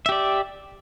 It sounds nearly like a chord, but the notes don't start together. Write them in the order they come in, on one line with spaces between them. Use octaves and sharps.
E5 G4 D5